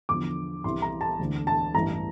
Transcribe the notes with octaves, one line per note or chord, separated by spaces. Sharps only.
E2 D3 F3 D6
C2 C3 E3 C6
A#5
A5
E1 D2 D3
A5
A1 G2 E3 A#5